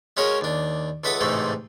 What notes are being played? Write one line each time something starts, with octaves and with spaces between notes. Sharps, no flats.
G#3 C#4 F#4 G#4 A#4 C#5
D#2 D4
C#2 A4 B4 E5 F#5 D#6
A1 G#2 C3 G#3 A3 A4